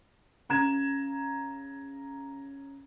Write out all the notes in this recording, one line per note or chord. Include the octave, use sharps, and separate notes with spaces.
C#3 A#5 G#6 E7